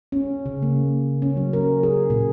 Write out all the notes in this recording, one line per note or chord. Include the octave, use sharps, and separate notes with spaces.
C#4
C#3
A#3
C#4
F#3
A#4
G#4
A#2